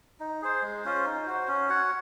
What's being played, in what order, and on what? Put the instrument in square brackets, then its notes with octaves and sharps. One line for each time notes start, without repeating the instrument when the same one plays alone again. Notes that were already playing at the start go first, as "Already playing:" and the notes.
[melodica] D#4
G#4 C5
G#3
C#4 F4 C5
D#4
F#4 C5
C#4
F#4 C#5 F#5